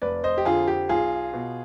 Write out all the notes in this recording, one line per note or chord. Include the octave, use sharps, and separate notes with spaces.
F1 B4 D5
C5 D#5
G4
F2 D3 F3 F4 G#4
G4
B1 F4 G#4
B2